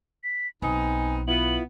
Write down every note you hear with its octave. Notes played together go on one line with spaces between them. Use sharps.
B6
B1 B3 C4 D#4 G#5
B3 E4 F4 F#7